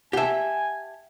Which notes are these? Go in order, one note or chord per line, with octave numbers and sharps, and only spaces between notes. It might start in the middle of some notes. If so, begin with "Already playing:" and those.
G4 E5 F#5 G#5 A5